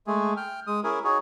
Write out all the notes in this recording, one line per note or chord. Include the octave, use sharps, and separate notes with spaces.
G#3 A3 G#4
G5 F6
G#3 D#6
C#4 E4 G#4 A#4
D#4 F#4 G#4 C#5